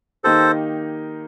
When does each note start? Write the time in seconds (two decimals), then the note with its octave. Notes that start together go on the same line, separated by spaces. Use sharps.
0.24 D#3 A#3 D#4 G4 A4 C5